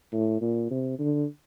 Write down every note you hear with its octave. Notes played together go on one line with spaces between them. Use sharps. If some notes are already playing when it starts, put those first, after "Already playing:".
A2
A#2
C3
D3